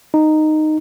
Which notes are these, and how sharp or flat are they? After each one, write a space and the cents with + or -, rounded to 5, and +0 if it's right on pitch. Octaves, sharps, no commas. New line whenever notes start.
D#4 -10